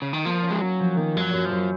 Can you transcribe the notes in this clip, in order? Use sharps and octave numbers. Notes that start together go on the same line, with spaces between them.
C#3
D#3
F3 A#3
C#4
G#3
F#3 C#4
F3
D#3 A#3
F#2 G#3
F#3
F#2
F3
F#2